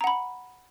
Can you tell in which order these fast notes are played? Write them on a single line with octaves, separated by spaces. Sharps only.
A#5 F#5 B5